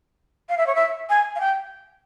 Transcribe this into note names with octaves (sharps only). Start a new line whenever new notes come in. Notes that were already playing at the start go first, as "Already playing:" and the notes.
F5
E5
C#5
E5
G#5
F5
G5